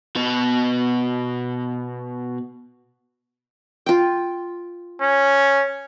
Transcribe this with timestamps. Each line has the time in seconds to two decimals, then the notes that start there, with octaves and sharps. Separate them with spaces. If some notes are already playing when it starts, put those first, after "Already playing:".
0.16 B2 B4
3.86 F4 G5
5.02 C#4